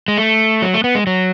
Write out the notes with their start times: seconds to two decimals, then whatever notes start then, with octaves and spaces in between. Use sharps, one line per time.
0.08 G#3
0.18 A3
0.62 F#3
0.74 A3
0.84 B3
0.95 G#3
1.07 F#3